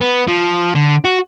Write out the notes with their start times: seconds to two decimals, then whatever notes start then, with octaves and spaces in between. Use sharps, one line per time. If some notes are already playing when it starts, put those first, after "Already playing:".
0.01 B3
0.27 F3
0.75 D3
1.05 F#4